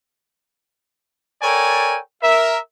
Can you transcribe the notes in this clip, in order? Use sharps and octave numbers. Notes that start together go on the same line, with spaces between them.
A4 A#4 C#5 D5 G5 G#5
A#4 E5